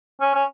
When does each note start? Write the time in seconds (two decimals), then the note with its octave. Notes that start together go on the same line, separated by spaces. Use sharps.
0.21 C#4
0.35 C#4